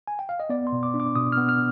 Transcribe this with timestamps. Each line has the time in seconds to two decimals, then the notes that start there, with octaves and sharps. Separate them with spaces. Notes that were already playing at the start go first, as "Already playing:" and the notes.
0.07 G#5
0.19 G5
0.29 F5
0.40 D#5
0.50 B3 D5
0.67 C6
0.72 B2
0.83 D6
0.94 D4
1.00 D6
1.16 B2 D#6
1.32 B3 F6
1.49 F6